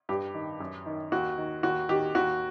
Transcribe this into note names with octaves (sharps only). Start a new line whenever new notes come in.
G2 G4
D#3
F#2
D#3
D#2 F#4
D#3
D#2 F#4
D#3 G4
D#2 F#4